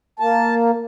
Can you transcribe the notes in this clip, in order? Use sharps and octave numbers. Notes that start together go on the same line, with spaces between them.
A#3 A5